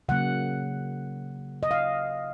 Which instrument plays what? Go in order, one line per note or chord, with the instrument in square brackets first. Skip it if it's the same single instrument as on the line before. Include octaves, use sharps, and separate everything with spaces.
[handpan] C#3 F#3 A#3 F#5
D#5
F5